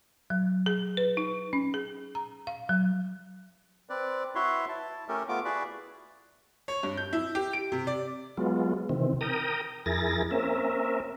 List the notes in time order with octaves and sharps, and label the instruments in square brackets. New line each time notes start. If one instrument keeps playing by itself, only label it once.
[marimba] F#3
G#4
B4
D#4
C#4
G#4
A#5
F5
F#3
[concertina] C4 B4 D5
E4 F#4 B4 C#5 E5 C6
E4 A5
A3 C#4 G4 A4 A#4
A3 B3 F4 D6
E4 F#4 G#4 B4 D5 E5
[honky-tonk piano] C#5
G2
G6
E4
G4
D7
C3
D5
[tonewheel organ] F#3 G#3 B3 F4
C3 D#3 E3 C4
A#4 G5 A#5 D#6
F2 E4 G#4 A#4 A6 A#6
A#3 C4 C#4 A#4 E5